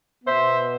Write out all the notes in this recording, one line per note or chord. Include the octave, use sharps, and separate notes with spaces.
B2 B3 C5 E5